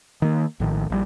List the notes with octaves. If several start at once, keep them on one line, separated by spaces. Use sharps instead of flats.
D#3 A#3
A#1 A2 D#3
A#1 D#3 G3